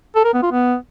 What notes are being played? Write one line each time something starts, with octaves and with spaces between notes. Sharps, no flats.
A4
A#4
B3
F4
B3